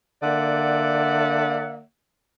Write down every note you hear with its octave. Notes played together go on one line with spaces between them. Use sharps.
D3 A#3 D5 E5 F#5